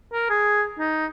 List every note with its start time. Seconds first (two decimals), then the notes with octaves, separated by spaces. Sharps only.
0.13 A#4
0.30 G#4
0.79 D#4